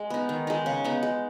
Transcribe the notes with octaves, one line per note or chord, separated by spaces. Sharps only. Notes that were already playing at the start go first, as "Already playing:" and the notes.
Already playing: G#3
B3 D#4
D#3
G#3 D#4
C#3
B3 D#4
G#3